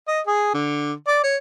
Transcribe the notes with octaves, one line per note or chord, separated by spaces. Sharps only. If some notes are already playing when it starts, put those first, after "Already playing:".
D#5
G#4
D3
D5
C#5